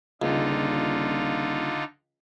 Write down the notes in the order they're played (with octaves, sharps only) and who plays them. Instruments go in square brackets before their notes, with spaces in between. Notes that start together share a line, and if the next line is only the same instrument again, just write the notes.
[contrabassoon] D#1 [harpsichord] C#2 [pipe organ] D3 D#4 F4